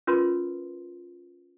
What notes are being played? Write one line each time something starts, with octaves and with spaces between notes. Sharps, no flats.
C#4 F4 A#4 B4 C6